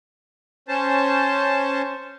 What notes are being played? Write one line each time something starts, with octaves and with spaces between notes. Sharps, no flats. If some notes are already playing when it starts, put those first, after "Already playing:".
C#4 C5 A5